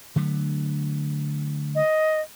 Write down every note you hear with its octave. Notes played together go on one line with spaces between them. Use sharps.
D3 F#3 A3
D#5